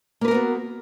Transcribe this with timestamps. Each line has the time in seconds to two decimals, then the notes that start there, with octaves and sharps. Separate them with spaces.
0.21 A#3
0.25 B4
0.28 A#4
0.31 B3
0.34 F#4